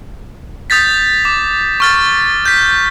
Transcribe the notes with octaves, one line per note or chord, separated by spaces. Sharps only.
D#6 G6 A6 B6
D6
C#6 F6 A6
G6 B6